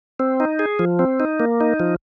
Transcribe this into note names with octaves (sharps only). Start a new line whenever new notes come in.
C4
D#4
G#4
F3
C4
D#4
A#3
D#4
F3